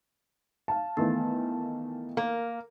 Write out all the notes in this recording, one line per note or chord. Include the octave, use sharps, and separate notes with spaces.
F5 A5
D#3 E3 A3 B3
A#3 A#4